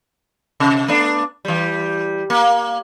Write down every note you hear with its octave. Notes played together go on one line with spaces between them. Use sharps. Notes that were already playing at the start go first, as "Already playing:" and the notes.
C3
A3 B3 D4
E3 G3
A#3